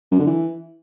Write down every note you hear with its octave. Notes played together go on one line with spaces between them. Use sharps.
F#2
D3
E3